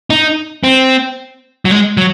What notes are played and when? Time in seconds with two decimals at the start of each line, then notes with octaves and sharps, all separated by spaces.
0.10 D#4
0.64 C4
1.65 F#3
1.71 G#3
1.97 F#3